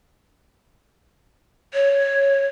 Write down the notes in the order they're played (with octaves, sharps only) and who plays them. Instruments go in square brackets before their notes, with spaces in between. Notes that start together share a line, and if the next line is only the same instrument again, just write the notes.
[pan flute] C#5